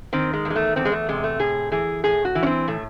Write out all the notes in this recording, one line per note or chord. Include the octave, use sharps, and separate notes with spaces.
D#3 C4
G#3
E2
G#3
A3
E2 C4
G#3
A3
C3 G#3
A3
A2 G#4
E3 G#4
A2 G#4
F#4
E3
C#4
C4
A2 A3